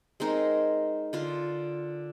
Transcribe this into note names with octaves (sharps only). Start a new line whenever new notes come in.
G#3 C4 D#4 A#4
D3 F4 C6